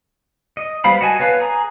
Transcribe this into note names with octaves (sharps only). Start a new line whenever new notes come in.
D#5
G3 B3 C5 F5 B5
F#4 D#5 G#5 A5
B3 B4 C#5 F5
G#4 A#5 D#6